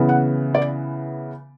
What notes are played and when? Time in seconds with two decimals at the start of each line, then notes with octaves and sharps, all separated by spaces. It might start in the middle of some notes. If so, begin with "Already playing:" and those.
Already playing: C#3 E3 B3
0.09 F#5
0.54 D5